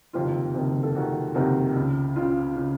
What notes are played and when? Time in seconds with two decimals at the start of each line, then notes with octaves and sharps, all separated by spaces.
0.13 F#1 F2 C3 D#3 F4
0.54 F#1 F2 C3 D#3
0.83 A4
0.95 F#1 F2 C3 D#3 F#4
1.34 F#1 F2 C3 D#3 F#4
1.75 C#2 C#3
2.16 C#2 C#3 F4
2.56 C#3